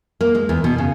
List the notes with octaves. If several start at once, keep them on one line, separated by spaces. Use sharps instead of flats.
A#3
G#3
E2
B2
C#3